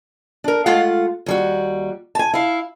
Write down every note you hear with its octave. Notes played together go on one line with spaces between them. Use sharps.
D4 A#4
G#3 A3 F4 F5 F#5
D#2 G3 F#4
G#5 A5
E4 F5